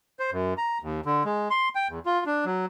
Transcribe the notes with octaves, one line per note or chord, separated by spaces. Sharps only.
C5
F#2
A#5
D#2
D3
G#3
C6
G5
E2
F4
D4
F#3